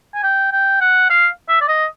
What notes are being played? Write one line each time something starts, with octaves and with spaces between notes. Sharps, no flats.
G#5
G5
G5
F#5
F5
E5
D5
D#5